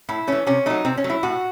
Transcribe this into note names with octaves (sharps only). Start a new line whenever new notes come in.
A2 E4
E3 A3 C#4
C3 C#4
F#3 A3 D#4
C3 C4
C#4
F#3 A3
E4
A2 F#4